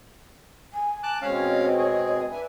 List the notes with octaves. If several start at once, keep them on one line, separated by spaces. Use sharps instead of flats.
G#5
A5 D6 F#6
B2 G#3 C4 C#4 C#5 F5
G#4
D4 B4 E5 G#5